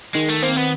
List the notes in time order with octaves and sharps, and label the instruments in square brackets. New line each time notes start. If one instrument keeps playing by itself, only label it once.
[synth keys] D#3 [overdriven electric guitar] G#3
[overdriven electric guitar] A3
[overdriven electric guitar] A#3 [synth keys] C4
[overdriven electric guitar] B3